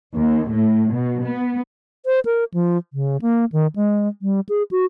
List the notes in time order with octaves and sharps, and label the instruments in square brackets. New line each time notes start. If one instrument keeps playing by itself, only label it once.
[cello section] D#2
A2
B2
B3
[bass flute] C5
A#4
F3
C#3
A#3
D#3
G#3
G3
G#4
F#4